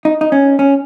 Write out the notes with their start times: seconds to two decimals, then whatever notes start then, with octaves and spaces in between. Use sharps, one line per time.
0.05 D#4
0.21 D#4
0.32 C#4
0.59 C#4